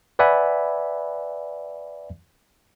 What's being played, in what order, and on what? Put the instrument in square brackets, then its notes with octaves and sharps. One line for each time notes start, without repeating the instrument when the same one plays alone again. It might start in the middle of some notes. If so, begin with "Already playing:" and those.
[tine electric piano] B4 D5 E5 F#5 G#5 B5